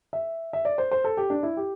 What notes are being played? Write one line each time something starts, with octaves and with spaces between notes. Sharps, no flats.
E5
E5
D5
C5
C5
A4
G4
D4
E4
G4